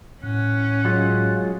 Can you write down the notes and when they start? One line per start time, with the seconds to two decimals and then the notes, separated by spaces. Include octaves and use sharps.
0.23 A2 C#4 F#5
0.85 F#3 G#3 F4